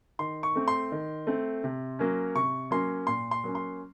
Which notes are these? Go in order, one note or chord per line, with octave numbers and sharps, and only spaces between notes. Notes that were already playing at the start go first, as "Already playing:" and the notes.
D#3 C6
C#6
A3 C4
C6
D#3
A3 C4
C3
F#3 A#3 C#4
C3 C#6
F#3 A#3 C#4 C6
A#2 C6
C6
F#3 A#3 C#4
C6